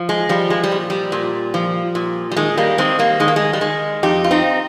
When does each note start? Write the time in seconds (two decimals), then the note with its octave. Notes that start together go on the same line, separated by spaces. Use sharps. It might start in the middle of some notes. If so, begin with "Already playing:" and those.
Already playing: F3
0.09 G#3
0.29 F3 G3
0.50 G#3
0.64 G3
0.72 A#2
0.90 G3
1.12 A#2
1.54 F3
1.95 A#2
2.31 G3
2.36 D#3 G#3
2.57 G3 A#3
2.78 D#3 G#3 C4
2.99 G3 A#3
3.20 D#3 G#3
3.28 A#3
3.36 G#3
3.53 G3
3.61 D#3 G#3
4.03 F2 D#4 G4
4.24 F4
4.31 C4 D#4